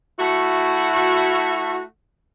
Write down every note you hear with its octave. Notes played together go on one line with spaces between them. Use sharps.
A3 E4 F#4